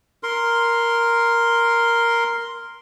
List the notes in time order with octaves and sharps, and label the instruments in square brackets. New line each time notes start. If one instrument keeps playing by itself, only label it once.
[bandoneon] A#4 C6